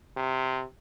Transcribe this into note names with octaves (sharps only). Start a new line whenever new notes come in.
C3